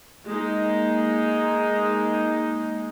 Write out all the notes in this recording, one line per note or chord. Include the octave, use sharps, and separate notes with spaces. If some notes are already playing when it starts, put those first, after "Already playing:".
G#3 A#3 D#4